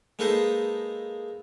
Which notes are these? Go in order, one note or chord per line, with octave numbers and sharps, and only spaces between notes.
G#3 A#3 D#4 A4 B4 C5